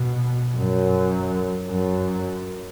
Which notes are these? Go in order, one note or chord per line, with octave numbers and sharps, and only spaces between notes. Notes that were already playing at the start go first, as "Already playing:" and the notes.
Already playing: B2
F#2
F#2